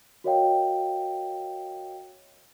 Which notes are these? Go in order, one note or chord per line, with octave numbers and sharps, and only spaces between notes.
F#4 A#4 C#5 D#5 F5 G5